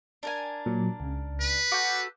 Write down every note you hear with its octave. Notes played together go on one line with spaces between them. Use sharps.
D4 A#4 G#5
A#2 F#3
C#2 C#3
B4
F#4 A4 D6 G6